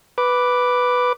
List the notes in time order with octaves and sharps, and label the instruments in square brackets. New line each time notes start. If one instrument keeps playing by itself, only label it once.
[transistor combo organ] B4 D6